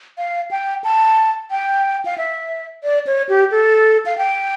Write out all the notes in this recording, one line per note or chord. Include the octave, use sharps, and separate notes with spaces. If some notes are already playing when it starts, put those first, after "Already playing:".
F5
G5
A5
G5
F5
E5
D5
C#5
G4
A4
F5
G5